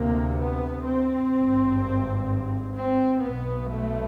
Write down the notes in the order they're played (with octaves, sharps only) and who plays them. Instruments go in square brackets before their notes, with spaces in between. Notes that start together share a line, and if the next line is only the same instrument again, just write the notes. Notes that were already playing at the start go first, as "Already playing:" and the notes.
Already playing: [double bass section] D2 C3 A#3
B3
C4
G#1 G2
C4
B1 B2 B3
A3